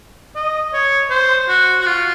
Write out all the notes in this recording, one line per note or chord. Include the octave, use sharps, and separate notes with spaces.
D#5
C#5
C5
F#4
F#4
F4